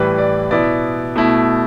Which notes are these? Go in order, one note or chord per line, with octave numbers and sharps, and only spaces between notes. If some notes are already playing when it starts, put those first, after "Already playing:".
Already playing: A2 E3 G3 B4
D5
B2 B3 E4 D5
B2 A3 E4